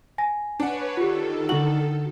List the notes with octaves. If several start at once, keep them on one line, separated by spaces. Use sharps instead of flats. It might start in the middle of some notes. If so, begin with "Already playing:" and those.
G#5 A#6
D4 B4 C#5 F#5
D#3 F4 G4 A4
D3 E4 F#4 F#7